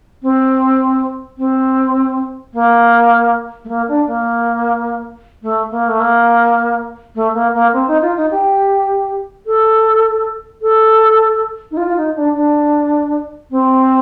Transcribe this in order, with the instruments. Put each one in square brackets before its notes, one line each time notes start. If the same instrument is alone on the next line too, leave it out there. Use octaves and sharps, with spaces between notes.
[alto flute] C4
C4
A#3
A3
A#3
D4
A#3
A3
A#3
A3
A#3
A3
A#3
A#3
C4
D#4
F4
D#4
G4
A4
A4
D#4
F4
F4
D#4
D4
D4
C4